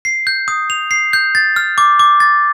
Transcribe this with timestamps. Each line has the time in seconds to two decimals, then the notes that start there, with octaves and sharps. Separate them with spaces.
0.05 C7
0.27 G6
0.48 D#6
0.70 F7
0.91 C7
1.13 G6
1.35 A6
1.56 F6
1.78 D6
1.99 D6
2.20 A6